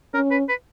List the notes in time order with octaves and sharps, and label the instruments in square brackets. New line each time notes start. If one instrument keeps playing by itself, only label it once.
[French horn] C#4 [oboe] A#4
[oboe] B4
B4